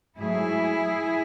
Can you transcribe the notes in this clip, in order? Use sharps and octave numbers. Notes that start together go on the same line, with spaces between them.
G#2 F#3 A3 E4 G#4